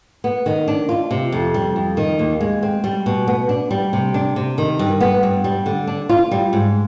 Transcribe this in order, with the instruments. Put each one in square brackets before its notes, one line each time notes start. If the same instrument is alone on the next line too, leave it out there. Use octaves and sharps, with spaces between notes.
[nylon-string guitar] B3
D#3
D4
F4
C3
F2
G3
F2
D#3
D#2
G#3
C4
G3
B2
B3
D4
G3
C3
D4
C3
D#3
G2
B3
G2
G3
D3
D4
F4
G3
G#2